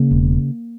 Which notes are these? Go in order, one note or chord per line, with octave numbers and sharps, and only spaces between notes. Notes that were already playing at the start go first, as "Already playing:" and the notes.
Already playing: C#3 A#3
E1